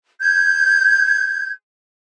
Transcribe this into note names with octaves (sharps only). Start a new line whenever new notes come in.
G6 G#6